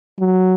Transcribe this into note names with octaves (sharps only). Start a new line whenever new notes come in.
F#3